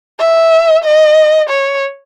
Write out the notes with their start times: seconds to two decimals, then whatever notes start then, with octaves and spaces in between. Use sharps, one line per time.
0.19 E5
0.84 D#5
1.49 C#5